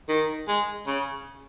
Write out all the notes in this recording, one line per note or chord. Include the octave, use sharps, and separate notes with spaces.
D#3
G#3
C#3